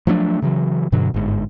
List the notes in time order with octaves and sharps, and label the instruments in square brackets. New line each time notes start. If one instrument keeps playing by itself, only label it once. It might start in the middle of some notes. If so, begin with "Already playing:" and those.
[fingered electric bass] F3 F#3 A3 D4
C#3 E3 F#3
G2 B2 D3 F#3
G1 G#2